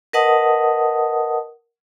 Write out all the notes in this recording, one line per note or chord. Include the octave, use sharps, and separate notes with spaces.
A#4 B4 D#5 F#5 A5 D#6